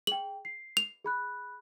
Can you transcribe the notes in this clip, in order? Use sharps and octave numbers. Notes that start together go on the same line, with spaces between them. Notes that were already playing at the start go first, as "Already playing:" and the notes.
G#4 G5 F#7
C7
F7
G#4 B5 F#6